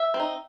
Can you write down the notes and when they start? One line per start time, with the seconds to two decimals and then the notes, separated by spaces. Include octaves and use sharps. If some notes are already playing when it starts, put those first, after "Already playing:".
Already playing: E5
0.14 C4
0.20 D#4